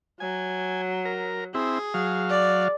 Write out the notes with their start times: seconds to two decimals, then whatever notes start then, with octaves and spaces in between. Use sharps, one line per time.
0.20 F#3 G#5
1.05 A#4
1.54 C4 E4 G#4
1.94 F#3 F5
2.30 D5